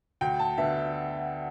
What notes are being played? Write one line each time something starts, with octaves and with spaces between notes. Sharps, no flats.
D2 G5
A5
D3 B3 E5